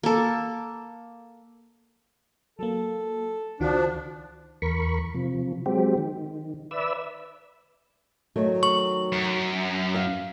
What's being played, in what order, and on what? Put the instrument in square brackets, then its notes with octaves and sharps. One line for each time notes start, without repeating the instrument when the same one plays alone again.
[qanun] A#3 A4
[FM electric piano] F#3 A#3 [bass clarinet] A4
[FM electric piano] C#2 D#3 F#4 [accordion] F3 D4
[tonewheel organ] E2 A#4 B5 C#6
C3 F3
F#3 G#3 C4 G4
D#3
B4 D5 E5 E6
[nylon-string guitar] D#3 F#3 A3
[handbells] C#6
[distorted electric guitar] F#2
[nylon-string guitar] F5